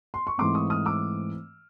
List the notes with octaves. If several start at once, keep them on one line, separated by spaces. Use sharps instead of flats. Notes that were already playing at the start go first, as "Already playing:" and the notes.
C6
C#6
G#2 E3 A3 C4 C6 D6
C#6 D#6
D#6 F6
D6 E6